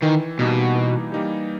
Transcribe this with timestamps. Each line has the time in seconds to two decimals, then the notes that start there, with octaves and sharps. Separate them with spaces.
0.03 D#3 E3
0.39 B2 G3 A#3 D#4 G4
0.75 E3
1.12 G3 A#3 D#4 G4